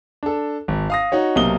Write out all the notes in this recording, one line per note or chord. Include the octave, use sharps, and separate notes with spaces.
D4 A4
G#1
F5 D#6 A#6
D#4 F#4 C#5
B1 C3 A#3 D#6 G7